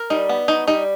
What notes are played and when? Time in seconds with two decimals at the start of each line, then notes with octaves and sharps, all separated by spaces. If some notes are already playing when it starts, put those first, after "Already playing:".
Already playing: A#4
0.10 G3 D#4
0.29 B3
0.48 F#3 D#4
0.67 G3 D#4